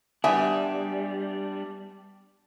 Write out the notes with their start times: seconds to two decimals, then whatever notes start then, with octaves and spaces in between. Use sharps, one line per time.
0.24 G3 B3 D4 E5 G#5